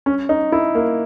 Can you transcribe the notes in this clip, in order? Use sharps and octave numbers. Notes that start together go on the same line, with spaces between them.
C#4
D#4
E4
A#3